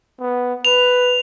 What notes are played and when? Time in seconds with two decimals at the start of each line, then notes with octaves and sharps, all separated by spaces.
0.20 B3
0.65 B4 F7